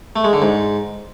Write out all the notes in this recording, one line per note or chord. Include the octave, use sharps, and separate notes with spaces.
A3
G#3
D3
G#2